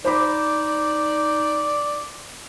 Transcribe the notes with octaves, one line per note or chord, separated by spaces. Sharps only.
D#4 C5 D5 B5 D6